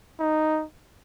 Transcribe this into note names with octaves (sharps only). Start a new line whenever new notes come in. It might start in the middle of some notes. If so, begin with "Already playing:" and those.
D#4